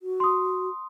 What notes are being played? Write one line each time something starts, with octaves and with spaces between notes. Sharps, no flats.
F#4
C6 D#6